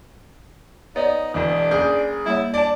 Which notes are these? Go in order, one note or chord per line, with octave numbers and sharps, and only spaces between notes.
B3 D#4 C#5 D5
E1 E2 D4
F#1 G#4 G6
G3 A#3 E4 C#5
D4 D5 A5